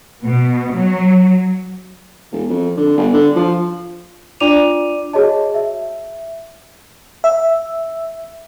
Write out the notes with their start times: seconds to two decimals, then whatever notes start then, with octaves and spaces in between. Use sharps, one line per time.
0.24 B2
0.74 F#3
2.32 E1
2.50 F2
2.77 D3
2.97 G1
3.13 D3
3.36 F3
4.40 D4 F4 D5 D6 D#7 F7
5.13 F#4 G#4 C#5 D#5 A5
5.54 E5
7.24 E5